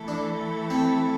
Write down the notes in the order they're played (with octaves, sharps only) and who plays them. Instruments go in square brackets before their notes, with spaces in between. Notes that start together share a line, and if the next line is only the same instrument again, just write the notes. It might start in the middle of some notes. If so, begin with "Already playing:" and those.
Already playing: [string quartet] E3 A3 E4 A4
[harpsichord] D4
C4